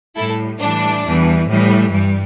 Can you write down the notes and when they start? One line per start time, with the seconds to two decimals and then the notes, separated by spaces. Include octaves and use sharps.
0.17 A2 G3 E4 A4
0.60 A2 E3 G3 D4
1.04 E2 E3 G3
1.49 A2 E3 G3
1.92 G2 G3